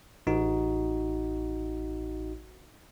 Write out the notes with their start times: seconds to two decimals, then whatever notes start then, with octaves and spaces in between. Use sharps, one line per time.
0.27 A1 D#4 F#4